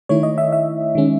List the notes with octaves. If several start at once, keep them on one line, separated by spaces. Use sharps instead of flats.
D#3 A3 E4 C#5
D#5
E5
E5
D#3 G#3 C#4